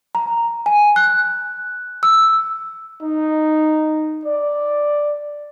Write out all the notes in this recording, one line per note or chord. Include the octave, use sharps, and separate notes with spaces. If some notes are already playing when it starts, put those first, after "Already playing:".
A#5
G#5
F#6
E6
D#4
D5